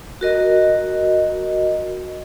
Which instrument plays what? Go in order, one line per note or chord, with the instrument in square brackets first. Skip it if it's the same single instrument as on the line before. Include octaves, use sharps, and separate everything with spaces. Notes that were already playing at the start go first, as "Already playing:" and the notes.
[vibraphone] F#4 A#4 D#5